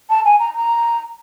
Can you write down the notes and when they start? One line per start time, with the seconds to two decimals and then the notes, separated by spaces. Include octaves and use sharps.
0.09 A5
0.25 G#5
0.39 A#5
0.54 A#5